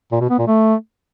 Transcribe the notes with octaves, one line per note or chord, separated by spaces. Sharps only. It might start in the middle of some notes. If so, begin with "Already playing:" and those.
A#2
B2
B3
A#2
A3